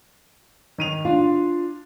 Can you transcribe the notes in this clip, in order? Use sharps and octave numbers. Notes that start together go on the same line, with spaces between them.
D#3 D#7 F7
D4 F4